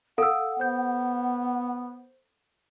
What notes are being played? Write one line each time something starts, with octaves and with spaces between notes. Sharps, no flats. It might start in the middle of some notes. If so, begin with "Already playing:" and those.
A4 F5 F#5 E6
B3 C5 G6